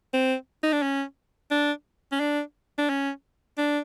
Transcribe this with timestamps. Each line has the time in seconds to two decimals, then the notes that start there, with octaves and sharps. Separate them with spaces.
0.14 C4
0.63 D#4
0.72 D4
0.82 C#4
1.51 D4
2.12 C#4
2.20 D4
2.78 D4
2.89 C#4
3.58 D4